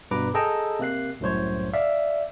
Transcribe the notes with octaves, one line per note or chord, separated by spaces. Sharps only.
G2 B2 B4 A#5 D6
G#4 A4 D#5 G5 A#5 E6
C3 A#3 F#6 C7
C2 F#2 A2 C5 C#5
D5 E5 F5